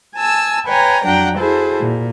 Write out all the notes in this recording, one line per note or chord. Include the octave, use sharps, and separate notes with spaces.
G#5 A5 E6
B4 C#5 G5 G#5 A#5
F2 F#3 D4 F#5 G5 A#5
E4 F#4 G#4 A4 C5
A#2